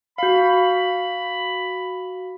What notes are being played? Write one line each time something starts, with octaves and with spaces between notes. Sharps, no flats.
F#4 F5 B5